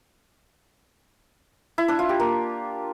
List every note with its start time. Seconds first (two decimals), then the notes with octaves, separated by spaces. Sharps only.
1.78 E4
1.88 D4
1.99 F4
2.09 G4
2.20 A#3